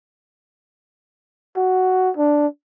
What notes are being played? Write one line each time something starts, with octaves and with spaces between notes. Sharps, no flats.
F#4
D4